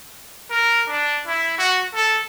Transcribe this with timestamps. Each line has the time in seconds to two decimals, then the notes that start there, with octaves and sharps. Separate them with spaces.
0.50 A#4
0.88 D4
1.27 E4
1.58 F#4
1.94 A4